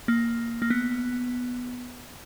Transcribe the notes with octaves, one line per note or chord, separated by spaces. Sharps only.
A#3
A#3
B3